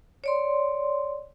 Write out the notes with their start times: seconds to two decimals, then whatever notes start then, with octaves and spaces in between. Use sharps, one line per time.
0.24 C#5 D5 C6